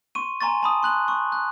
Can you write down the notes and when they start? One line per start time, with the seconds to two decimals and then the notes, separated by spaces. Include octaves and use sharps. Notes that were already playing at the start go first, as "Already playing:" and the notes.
0.15 C6 C#6 D#7
0.41 G#5 A#5 C6 C#6 A6
0.63 A5 B5 D#6
0.83 C6 F#6 F#7
1.08 C#6
1.32 F#6